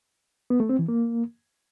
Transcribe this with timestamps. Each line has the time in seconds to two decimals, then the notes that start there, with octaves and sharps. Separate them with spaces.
0.50 B3
0.60 A3
0.69 C4
0.79 E3
0.88 A#3